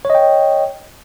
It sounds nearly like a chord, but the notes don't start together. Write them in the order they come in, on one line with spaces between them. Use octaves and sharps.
C#5 D#5 G5